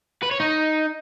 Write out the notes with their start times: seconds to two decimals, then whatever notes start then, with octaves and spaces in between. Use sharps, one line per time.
0.23 B4
0.31 C#5
0.40 D#4